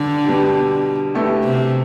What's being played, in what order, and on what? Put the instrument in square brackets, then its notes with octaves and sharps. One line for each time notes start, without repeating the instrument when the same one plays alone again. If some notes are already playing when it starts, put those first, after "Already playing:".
Already playing: [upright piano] B2 G3 D4 G4 [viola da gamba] D3
[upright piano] B2 G3 D4 G4
B2 A3 E4 G4
[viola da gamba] C3